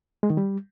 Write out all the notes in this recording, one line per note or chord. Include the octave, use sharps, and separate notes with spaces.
G#3
D#3
G3